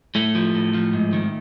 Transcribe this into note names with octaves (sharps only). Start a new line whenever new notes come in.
A2 A3
F3
A2
F3
G#2
D#3